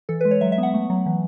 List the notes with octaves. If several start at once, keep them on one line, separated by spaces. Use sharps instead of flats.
E3 A4
B4
G#3
C#5
F#3 E5
E5
B3 F#5
A3
F#3
E3